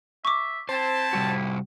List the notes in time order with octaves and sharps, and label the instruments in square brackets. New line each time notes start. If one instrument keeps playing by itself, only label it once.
[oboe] E5 [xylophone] C#6 D6
[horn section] C4 A5 [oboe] E4 [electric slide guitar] C5
[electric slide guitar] C3 G3 F#4